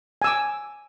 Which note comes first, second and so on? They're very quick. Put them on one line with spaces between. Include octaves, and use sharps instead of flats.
G#5 E6 D6